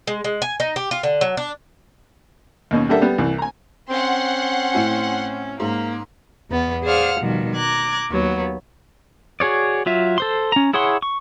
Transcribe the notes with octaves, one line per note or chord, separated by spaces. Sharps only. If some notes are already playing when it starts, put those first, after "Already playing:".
G#3
G#3
G#5
D#4
G4
F4
D3
F#3
D4
D#2 B2 C#4
G3 A#3 D4 A4 E5 F#5
G3 B3
C2 E3
G#5 A#5
C4 C#4 F#5 C6
A2 E4 G#5
G#2 A#3
E2 B3
G#4 C5 D5 F5 F#5 F6
B2 D#3 F3 G3
A#5 D6 F#6 G#6
D#2 F#3 B3
F#4 G#4 C#5 D5
F#3 F4 E5
A4 C5 C6
C#4 A#5
E4 G#4 C#5 F#5 C6
C#6